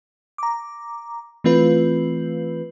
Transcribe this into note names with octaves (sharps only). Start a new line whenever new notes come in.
A#5 D6
E3 A3 C4 F4 B4